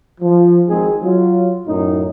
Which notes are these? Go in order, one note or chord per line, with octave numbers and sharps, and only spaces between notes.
F3
G#1 G#2 C4 D#4 G#4
F#3 F4
F#2 A2 D#4